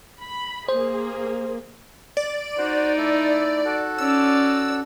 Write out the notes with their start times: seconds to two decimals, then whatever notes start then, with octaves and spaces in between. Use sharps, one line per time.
0.21 B5
0.68 A#3 G#4 C5
2.17 D5
2.58 D#4 F#4 C5
2.97 A3 E4
3.65 F#4 A4
3.98 C#4 D5 E6